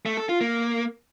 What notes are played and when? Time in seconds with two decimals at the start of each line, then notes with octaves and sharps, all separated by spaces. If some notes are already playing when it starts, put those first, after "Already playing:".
0.06 A3
0.17 A4
0.29 F4
0.41 A#3